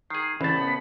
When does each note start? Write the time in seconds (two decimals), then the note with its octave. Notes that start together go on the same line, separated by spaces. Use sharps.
0.10 D#3 G#4 C7
0.41 C2 A2 C#3 E3 A5 B5
0.57 B3